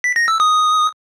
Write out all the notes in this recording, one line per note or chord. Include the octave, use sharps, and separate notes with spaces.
B6
A#6
E6
D#6